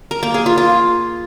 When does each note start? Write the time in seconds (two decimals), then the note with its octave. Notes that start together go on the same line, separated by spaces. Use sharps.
0.11 A#4
0.23 A#3
0.34 G#4
0.46 F4
0.58 F4